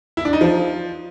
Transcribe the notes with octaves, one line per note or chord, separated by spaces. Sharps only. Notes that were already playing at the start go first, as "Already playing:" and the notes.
E4
D4
D#4
F3